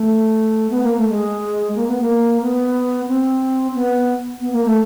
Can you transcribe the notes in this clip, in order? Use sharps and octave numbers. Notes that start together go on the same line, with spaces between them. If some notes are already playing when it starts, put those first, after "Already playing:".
Already playing: A3
B3
A#3
A3
G#3
A#3
B3
A#3
B3
C4
B3
B3
A#3
A3